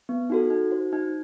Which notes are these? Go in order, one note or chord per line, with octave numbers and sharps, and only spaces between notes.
B3
D#4 F#4 A4
D#4
F#4 C5
D#4